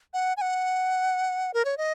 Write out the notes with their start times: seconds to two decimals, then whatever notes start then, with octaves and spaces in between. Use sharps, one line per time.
0.14 F#5
0.37 G#5
0.41 F#5
1.54 A#4
1.65 C#5
1.78 D#5